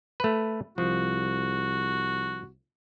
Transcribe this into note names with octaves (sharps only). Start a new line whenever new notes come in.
A3 B4
C2 F3 F#4